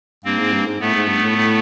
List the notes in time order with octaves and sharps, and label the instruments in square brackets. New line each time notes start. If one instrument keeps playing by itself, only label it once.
[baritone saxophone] G2 [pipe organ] A#3 C4
[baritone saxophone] G#2
G2
G#2
[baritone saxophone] A2 [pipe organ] A3 B3
[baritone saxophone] G#2
G2
A2
A2